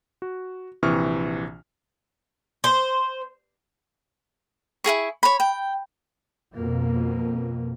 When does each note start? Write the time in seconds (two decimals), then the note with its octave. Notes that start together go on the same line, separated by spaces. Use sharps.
0.22 F#4
0.83 A#1 C3 E3 C#6 D#6 F6
2.64 C5
4.84 E4 F#4 G#4 C#6
5.23 C#5 B5
5.40 G5
6.55 F2 B2 A#3